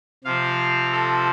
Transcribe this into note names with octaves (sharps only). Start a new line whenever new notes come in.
C3 F3 C4 F5
A4